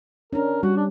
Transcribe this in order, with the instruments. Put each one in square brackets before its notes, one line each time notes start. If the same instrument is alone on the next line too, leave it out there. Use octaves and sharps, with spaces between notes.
[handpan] C#4 D4 [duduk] A#4
[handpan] G3 [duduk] F#4
[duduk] D4